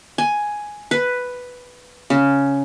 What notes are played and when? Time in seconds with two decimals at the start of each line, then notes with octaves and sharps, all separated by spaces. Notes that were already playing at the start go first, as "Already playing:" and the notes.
0.18 G#5
0.91 B4
2.10 C#3